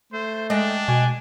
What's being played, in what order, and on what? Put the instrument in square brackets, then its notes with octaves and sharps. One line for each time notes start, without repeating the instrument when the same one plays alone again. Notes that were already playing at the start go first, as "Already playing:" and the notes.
[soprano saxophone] A3 [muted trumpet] C5
[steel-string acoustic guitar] G#3 D#5 G5 [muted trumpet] D4
[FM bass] B2 [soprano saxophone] G#5